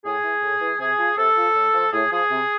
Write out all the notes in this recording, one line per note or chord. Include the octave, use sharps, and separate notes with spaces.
A2 G#4
E3
A2
E3
C3 G#4
F3
C3 A4
F3
A2
F3
A2 G#4
F3 G#4
C3